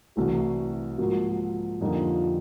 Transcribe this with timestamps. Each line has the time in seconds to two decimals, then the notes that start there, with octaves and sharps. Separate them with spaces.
0.17 C2 C3 E3 A3 F#4
0.98 G#2 F3 A#3 F#4
1.80 F2 D3 G3 A#3 D#4 F4